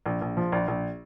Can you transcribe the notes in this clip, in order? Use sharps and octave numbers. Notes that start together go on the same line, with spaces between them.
A#1
A#1
F3
A#1
A#1